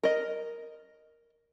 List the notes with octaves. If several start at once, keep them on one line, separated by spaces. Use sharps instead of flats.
A#4 D#5